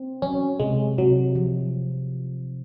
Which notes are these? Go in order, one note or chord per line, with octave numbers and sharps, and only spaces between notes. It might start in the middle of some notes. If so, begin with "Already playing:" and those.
Already playing: C4
F#3 C#4
C3 G#3
C3 F#3
F3